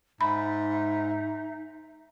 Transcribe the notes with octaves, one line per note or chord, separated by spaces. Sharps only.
G#2 D#4 E5 B5